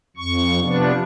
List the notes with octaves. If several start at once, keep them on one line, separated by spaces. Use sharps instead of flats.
F2 C#6
C3 F3 B3 D4